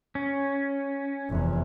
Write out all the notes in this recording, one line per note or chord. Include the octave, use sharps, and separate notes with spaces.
C#4
F1 E2